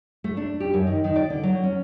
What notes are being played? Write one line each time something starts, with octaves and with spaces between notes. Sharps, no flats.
A3
D4
G4
F#2
D#3
D#3
D5
D3
F#3
C#4